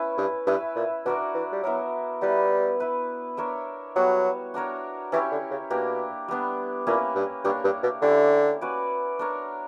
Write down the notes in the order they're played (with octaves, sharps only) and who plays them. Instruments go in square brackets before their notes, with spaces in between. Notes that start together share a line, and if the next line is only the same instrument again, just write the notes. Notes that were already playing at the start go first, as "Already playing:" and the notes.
Already playing: [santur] C#4 E4 B4
[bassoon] G2
[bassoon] G2 [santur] E4 B4 E5
[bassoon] A#2
[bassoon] B2 [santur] D4 F#4 A#4 D5
[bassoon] E3
G3
[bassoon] F#3 [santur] B3 E4 A#4 E5
[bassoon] G3 [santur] B3 E4 B4
[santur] E4 B4 E5
D4 A#4 C#5 E5
[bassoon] F#3 [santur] G3 B3 F#4 C#5
[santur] D4 F#4 A#4 C#5
[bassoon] E3 [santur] C#4 E4 G4 C#5
[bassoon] D3
C#3
[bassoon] B2 [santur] A#3 D4 G4
[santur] G3 B3 D4
[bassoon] A#2 [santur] A#3 C#4 E4 B4
[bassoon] G2
[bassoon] G2 [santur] A#3 D4 G4 C#5
[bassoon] G2
B2
[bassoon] D3 [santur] C#4 E4 G4 C#5
[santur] C#4 F#4 B4 D5
D4 A#4 C#5